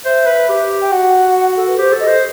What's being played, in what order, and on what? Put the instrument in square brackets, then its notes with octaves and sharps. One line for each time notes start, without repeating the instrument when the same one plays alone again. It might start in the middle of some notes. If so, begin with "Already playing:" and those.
[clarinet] C5 [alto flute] E5
[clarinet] B4
G4
[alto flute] G5
[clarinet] F#4 [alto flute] F#5
[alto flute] A4
B4
[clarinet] G4 [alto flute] C5
[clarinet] A4
[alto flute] D#5
[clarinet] C5